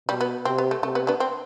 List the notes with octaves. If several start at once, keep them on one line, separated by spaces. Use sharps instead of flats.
B2 G3
B3
C3 C4
B3
A3
C3 A3
B3
B3 D4
C4